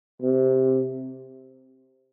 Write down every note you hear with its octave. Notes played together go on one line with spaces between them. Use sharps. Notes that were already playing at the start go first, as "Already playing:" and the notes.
C3